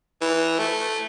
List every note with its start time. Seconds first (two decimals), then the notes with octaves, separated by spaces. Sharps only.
0.21 E3
0.59 A3